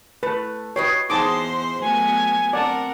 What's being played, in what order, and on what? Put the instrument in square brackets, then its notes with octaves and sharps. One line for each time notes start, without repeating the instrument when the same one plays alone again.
[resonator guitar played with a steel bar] A3 [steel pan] B4
[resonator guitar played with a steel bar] G4 B4 D#5 [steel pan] C#5 [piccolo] C7
[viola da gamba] E2 C5 [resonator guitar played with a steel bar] D#4 G#4 [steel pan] F#5 A5 D6 [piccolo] C6
[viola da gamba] F#3 A3 B3 [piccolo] G#5
[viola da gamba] C4 A#4 [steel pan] D5 A5 [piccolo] F#5